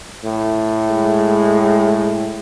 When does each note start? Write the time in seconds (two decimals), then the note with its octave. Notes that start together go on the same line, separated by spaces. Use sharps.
0.24 A2
0.93 G#3